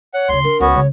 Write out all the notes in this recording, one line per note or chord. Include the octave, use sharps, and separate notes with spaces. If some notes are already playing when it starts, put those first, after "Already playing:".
C#5 F#5
D2 C#3 C6
D4 A#4
C#2 B3 C#4 F#4
C#3 G#3 C#5